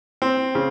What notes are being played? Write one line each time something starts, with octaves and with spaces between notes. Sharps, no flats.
C4
C#3